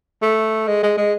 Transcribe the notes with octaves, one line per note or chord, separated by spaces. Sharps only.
A3
G#3
G#3
G#3